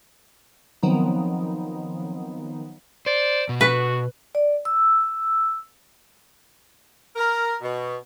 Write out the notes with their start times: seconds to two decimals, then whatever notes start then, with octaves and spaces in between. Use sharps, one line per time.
0.83 D#3 F3 F#3 B3 C4 D#4
3.06 C5 D5
3.49 B2
3.61 F#4 B4
4.35 D5
4.65 E6
7.16 A#4
7.61 B2